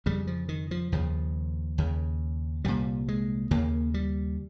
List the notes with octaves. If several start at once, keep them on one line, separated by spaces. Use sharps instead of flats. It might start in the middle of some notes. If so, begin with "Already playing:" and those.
F2 C#3 G3
F3
D#3
F3
D#2 C#3 F3
D#2 C#3
C2 A#2 G3
G#3
D#2 C#3 A#3
G3